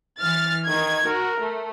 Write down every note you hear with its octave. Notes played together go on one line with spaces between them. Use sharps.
E3 F6 A6
D#3 D#4 G#6
F#4 A#4
A3